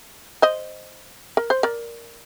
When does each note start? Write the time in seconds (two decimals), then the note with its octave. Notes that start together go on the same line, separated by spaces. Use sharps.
0.42 C5 D#5
1.37 A#4
1.50 C5
1.63 A#4 D5